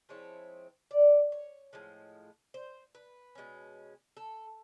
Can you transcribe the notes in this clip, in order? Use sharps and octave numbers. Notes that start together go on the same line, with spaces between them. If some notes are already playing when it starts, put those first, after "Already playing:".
F3 G#3 C4 E4 C#5
D5
C#5
A2 F3 G#3
C5
B4
B2 G#3 C#4
A4